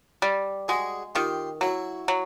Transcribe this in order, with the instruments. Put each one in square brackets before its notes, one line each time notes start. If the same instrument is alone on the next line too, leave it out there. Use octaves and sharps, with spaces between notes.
[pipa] G3
[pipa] G#3 [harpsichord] F#4 G#4
[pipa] D#3 [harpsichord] F4 G4
[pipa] F#3 [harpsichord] E4 F#4
[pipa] F#3